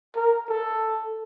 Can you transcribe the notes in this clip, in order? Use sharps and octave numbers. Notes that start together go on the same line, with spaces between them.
A#4
A4